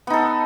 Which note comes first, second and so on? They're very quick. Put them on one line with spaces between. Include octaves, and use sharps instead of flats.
B3 D#4 A4